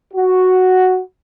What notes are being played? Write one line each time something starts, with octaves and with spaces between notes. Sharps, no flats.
F#4